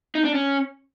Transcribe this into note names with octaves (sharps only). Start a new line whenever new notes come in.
D#4
D4
C#4